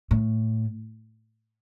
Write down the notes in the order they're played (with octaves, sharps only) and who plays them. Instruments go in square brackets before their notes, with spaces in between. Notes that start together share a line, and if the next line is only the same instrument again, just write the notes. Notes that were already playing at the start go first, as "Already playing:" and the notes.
[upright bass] A2